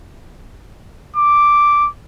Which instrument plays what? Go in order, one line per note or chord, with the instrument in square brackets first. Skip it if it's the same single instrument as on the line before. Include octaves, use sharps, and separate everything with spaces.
[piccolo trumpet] D6